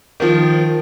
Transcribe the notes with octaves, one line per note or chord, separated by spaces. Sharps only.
D#3 F3